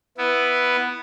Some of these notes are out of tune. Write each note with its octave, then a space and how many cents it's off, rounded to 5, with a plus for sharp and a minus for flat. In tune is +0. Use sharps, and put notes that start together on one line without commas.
B3 +0 E4 +0